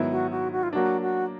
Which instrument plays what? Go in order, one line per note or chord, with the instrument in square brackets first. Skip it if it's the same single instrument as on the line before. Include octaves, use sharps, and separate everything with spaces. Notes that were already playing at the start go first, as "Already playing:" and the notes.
Already playing: [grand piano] G#2 D#3 F#3 B3 E4
[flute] F#4
F#4
F#4
F4
[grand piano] F#3 A#3 D4 [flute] F#4
[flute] F#4